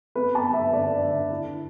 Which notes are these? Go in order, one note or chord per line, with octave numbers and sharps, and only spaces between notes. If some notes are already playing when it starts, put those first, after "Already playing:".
B3 B4
A5
B3
E5
D3 D5
D3 E5
E4